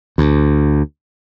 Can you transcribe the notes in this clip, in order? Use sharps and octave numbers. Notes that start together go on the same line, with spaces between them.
D2